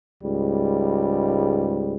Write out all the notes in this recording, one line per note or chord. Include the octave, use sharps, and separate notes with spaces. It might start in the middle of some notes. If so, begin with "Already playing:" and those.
C#2 G#2 G3